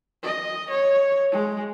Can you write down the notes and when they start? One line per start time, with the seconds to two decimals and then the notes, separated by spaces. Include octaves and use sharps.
0.23 D#5
0.70 C#5
1.32 G#3